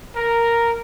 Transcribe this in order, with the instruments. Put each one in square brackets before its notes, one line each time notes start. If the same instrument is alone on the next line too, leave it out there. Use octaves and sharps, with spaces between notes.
[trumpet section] A#4